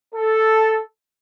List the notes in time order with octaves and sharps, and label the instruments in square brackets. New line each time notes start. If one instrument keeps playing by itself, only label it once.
[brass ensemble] A4